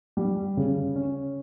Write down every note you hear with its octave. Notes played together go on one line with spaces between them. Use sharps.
G3
C#3
C#4